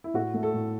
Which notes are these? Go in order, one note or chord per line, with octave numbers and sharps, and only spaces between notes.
E4
A2 F#4
A3
A4
A2